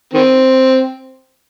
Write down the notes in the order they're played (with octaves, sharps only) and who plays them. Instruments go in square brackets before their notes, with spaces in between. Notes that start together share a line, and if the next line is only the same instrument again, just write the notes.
[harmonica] D#3 C4